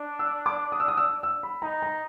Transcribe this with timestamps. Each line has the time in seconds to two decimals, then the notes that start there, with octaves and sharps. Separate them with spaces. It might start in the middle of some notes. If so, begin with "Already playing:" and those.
Already playing: D4
0.19 E6
0.46 D6
0.72 D#6
0.80 E6
0.88 D#6
0.97 E6
1.23 E6
1.43 B5
1.62 D#4 A#5
1.82 A#5